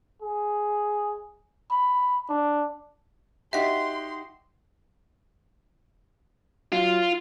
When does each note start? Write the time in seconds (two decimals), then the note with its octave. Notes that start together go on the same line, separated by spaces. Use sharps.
0.22 G#4
1.71 B5
2.30 D4
3.53 D#4 F#4 G4 E5 C6 B6
6.72 F#3 F4